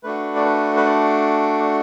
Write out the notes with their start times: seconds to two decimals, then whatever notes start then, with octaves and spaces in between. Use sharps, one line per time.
0.03 A3 D4 F#4 B4
0.36 D5
0.45 B4
0.76 B4
0.86 D5